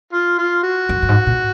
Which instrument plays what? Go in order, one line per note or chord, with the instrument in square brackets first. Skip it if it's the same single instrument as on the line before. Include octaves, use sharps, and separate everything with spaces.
[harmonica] F4
F4
F#4
[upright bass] F#2
F#2
G#2
A#2